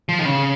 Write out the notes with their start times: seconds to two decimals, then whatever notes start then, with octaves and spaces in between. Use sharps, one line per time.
0.09 F3
0.19 D#3
0.26 C#3